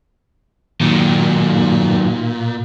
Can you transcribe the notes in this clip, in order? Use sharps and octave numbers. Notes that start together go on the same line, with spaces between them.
A#2 D#3 F#3